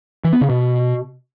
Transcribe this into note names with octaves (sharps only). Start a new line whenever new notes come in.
E3
B3
C#3
B2